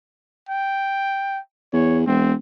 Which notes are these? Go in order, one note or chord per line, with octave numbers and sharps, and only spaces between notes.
G5
E2 C#5
E1 C4